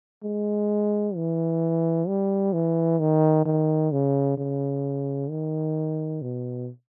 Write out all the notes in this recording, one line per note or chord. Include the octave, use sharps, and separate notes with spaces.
G#3
E3
G3
E3
D#3
D#3
C#3
C#3
D#3
B2